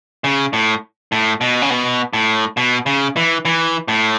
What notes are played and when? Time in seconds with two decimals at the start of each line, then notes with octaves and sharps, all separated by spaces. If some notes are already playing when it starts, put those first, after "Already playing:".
0.24 C#3
0.53 A2
1.12 A2
1.41 B2
1.62 C#3
1.70 B2
2.13 A2
2.57 B2
2.86 C#3
3.16 E3
3.45 E3
3.88 A2